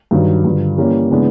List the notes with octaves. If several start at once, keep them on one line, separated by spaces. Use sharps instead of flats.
G2 D#3 F#3
G2 D3 F3
E3 G3 A#3 C#4
C#3 E3 G#3 B3 D4